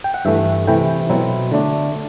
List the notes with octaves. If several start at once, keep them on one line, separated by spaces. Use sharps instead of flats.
G5
F#5
G2 E3 A3 E5
C3 E3 A3 E4 G5
B2 F#3 C4 E4
D3 A3 D4